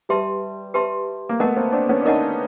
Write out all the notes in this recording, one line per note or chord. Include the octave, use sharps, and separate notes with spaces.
G3 G4 B4 E5 A5 C6
G4 B4 E5 A5 C6
A#3
A3 B3 A#4 D#5 F#5 A5
A#3 C4
C4 D4
B3 C#4
D4
C#4 D#4 A#4 D#5 F#5 A5